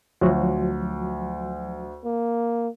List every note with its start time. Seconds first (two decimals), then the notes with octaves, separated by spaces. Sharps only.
0.21 D2 F3 F#3 F#4
2.04 A#3